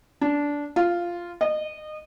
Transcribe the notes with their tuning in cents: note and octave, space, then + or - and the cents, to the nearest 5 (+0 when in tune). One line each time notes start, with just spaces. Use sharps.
D4 -15
F4 -5
D#5 -25